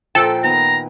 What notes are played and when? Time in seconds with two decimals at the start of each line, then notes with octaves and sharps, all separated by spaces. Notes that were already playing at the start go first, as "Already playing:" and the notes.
0.15 A#2 F3 A4 G5
0.44 D#3 B3 A#5